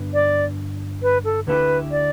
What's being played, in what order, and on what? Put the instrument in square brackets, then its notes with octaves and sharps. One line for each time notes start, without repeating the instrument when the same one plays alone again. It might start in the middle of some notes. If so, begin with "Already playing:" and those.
Already playing: [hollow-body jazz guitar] G2 D3 B3
[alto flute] D5
B4
A4
[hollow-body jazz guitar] D2 D3 A3 E4 G4 [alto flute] B4
[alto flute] D5